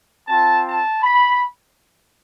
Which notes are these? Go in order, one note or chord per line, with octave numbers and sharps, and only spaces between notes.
C4 F4 A5
A5
B5